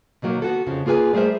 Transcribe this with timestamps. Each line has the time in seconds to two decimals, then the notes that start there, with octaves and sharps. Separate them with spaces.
0.22 B2 D#3 F#3 A#3
0.42 B3 F#4 A4
0.67 F2 C#3 F3
0.86 A#3 F4 G#4 B4 G#5
1.13 G3 A3 G#4 A#4 C5 E5